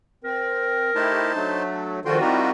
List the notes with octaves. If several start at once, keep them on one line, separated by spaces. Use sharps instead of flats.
C4 A#4
A3 D#4 E4 G4 C5 A5
F#3 A3 D4
D#3 F3 G3 F4 F#4 A4 G5 C6
C4 D#4 E4 G4 A#4